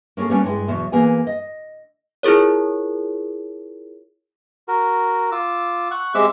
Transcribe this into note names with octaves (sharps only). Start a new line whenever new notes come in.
A#3 C#4 G#4 A4
G3 A#3 B3 C#4 D4
G2 G#3 E4
E2 B2 F#3 E5
E3 A#3 B3 G#4 G#5
D#5
E4 F4 G#4 A#4 C#5
F#4 A#4
F4 D6 E6
F#5 C#6
G#3 C4 G4 E5 D6 E6